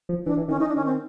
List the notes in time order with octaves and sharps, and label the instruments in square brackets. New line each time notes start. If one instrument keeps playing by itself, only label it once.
[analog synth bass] F3
[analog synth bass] E3 [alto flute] D4
[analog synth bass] E3
[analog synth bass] D#3 [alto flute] C#4
[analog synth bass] E3 [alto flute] D#4
[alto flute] D4
[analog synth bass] D#3 [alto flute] C#4
[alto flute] C4